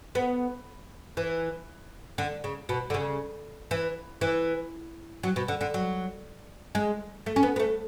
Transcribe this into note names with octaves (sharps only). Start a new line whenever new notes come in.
B3
E3
D3
C#3
B2
D3
C#3
E3
E3
F#3
B2
D3
D3
F#3
G#3
A3
C#4
B3
B3
A3